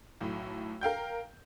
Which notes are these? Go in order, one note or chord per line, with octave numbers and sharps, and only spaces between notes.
B1 A2
A#4 F5 G5 G6